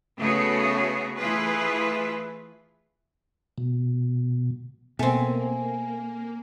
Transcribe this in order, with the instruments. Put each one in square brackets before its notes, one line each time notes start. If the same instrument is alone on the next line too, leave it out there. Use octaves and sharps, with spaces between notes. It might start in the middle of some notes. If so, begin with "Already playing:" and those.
[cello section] C#3 A3 B3 F#4 G#4 C#5
E3 A3 E4 F4 G#4 B4
[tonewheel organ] B2
[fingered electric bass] B2 [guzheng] A3 C4 [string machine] A#3 [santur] G#5